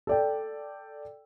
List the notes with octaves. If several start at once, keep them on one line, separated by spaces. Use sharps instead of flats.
A4 D5 G5